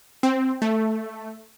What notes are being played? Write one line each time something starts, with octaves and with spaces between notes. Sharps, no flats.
C4
A3